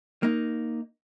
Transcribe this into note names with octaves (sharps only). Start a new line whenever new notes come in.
A#3 D#4